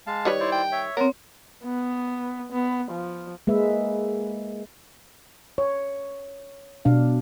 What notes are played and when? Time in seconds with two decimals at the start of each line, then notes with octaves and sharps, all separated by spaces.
0.07 G#3 F5 A5
0.25 D#3 G3 B4 C#5
0.40 E4 C5 D5
0.52 G5
0.72 C#5 E5
0.97 B3 C4 A#4 C#5
1.64 B3
2.52 B3
2.91 F3
3.47 G#3 A#3 B4 E5
5.58 C#5
6.85 B2 D4 F5